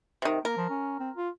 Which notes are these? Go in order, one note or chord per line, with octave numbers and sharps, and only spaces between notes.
C3 D#3
A#3 A#4
F3
C#4
C4
F4